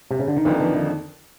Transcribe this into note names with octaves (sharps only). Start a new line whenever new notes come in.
C3
C#3
D3
D#3
F2 D3 E3 F3 A#3 D#4
E3
D#3